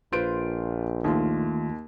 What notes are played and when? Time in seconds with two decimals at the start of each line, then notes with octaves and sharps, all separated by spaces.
0.13 A#1 F4 B4 C5 D7
1.04 D#2 D#3 A3 F4